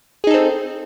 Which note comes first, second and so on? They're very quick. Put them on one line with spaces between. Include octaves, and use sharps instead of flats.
G#4 D#4 A4 C4